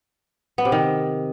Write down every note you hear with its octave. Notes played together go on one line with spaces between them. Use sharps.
B3
C3
D#3